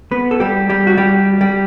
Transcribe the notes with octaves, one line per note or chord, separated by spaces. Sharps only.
B3 B4
A4
G3 G4
G3 G4
F#4
G3 G4
G3 G4